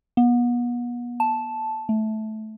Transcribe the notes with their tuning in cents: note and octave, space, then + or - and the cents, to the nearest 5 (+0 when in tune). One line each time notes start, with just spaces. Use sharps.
B3 -35
A5 -5
A3 -15